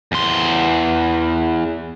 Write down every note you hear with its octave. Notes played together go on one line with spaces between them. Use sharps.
E2 C6